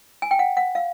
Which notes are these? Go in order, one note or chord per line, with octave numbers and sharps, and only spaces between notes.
G#5
G5
F#5
F#5
F5